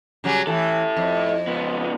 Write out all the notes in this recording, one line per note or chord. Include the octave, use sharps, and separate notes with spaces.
C#3 F#3 G3
E3 E4 A4
F2
C#2 B3